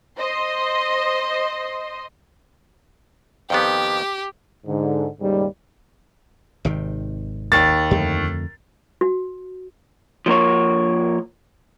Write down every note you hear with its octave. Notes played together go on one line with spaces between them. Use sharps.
C5 D#5 C6
F2 D#3 B3 G4
G#2 D3
D#2 G#2 C#3 G3
G#1 C3 D#3
D#2 A6
F2 D3 A3
F#4
F3 A#3 A#4 C#5